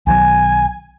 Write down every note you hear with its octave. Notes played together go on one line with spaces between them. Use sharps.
B1 D#3 F#3 G#5